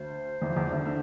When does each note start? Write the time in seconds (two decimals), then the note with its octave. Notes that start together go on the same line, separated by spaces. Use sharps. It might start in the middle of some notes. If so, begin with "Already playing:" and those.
Already playing: D2 C5
0.42 E2 E3
0.50 F3
0.56 E2 E3
0.70 D2 D3
0.85 D3